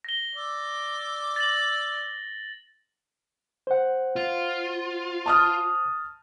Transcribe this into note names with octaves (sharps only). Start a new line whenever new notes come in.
A#6 G7
D5 D6 E6
A6 A#6 F#7
C5 F#5
F4
A5 D#6 F6